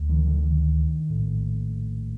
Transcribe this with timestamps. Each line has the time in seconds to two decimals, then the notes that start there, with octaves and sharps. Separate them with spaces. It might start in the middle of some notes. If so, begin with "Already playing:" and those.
Already playing: D2
0.09 D#3 F3
0.26 D3 E3
0.43 D#3
1.10 A#1 A2